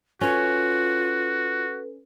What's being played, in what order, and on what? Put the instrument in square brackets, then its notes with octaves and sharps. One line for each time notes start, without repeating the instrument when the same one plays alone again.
[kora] C#4 C#5 [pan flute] F4 [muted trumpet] F#4 [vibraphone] A4 B4